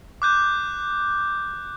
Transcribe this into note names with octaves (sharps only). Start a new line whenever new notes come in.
D6 F#6 G6